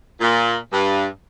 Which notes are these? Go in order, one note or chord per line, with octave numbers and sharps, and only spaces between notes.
A#2
G2